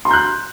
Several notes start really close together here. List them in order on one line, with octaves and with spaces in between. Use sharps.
C6 A#5 G6 F#6